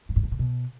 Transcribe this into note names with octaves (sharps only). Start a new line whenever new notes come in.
G2
G#2
A2
A#2
B2